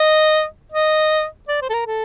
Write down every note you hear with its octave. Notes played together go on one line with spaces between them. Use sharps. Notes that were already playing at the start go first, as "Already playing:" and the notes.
Already playing: D#5
D#5
D5
C5
A4
A#4
A4